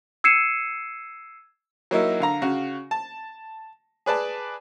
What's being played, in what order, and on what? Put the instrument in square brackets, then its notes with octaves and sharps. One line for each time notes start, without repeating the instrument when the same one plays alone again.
[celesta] E6 G#6 C7 C#7 D#7 E7
[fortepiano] F#3 A#3 D#4 E4
D3 F5 A#5
C#3 F#4 F5
A5
G#4 B4 D5 A5